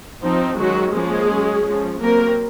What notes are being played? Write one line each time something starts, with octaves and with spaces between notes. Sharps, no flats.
F3 C4 D#4
D#3 F#3 G#3 C#4 F#4
F3 G#3 A#3 C#4 G#4
F#3 C#4
F3 G#3 C#4
F#3 A#3 C4 A#4